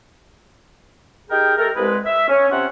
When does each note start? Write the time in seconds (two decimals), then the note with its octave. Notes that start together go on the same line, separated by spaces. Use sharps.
1.30 D#4 G4 G#4 A#4 G5
1.58 A3 G4 A4 A#4
1.76 C2 G#3 B4
2.05 E5
2.29 C#4
2.51 C3 C4 C#4 F4 E5 F#5